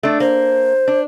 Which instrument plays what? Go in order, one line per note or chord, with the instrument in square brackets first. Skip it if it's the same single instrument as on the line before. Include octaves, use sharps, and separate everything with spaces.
[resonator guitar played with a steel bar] A3 D4
[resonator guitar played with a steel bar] A#3 [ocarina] C5
[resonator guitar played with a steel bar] D4